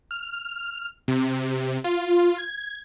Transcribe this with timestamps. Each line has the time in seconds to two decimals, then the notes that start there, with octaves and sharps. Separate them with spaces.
0.11 F6
1.08 C3
1.84 F4
2.38 G#6